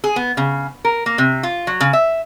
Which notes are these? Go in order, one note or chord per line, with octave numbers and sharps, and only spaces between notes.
G#4
B3
C#3
A#4
A#3
C3
F4
F#3
C#3
E5